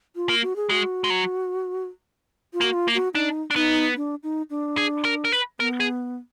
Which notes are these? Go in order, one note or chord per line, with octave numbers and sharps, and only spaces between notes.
F4
A#3
F#4
G#4
G#3 F#4
G#3
F#3
F4
A#3 F#4
F4
A#3
F#4
D4 D#4
D4
B3 D#4
D4
D#4
D4
G#4
A#4
A#4
B4
B3 A#4
G#4